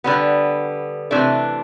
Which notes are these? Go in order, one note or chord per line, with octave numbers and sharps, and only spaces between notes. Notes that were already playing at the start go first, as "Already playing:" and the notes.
D3 G3 B3
C3 E3 A3 D4